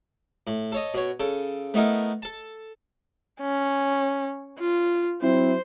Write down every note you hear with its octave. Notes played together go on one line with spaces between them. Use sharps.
A2
A4 C#5 D#5
B2 C#5
C#3 A4
A3 B3 D#4 E4 A#4
A4 A5
C#4
F4
F#3 C4 E4 C5